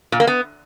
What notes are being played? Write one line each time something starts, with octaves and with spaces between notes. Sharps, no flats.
A#2
A#3
B3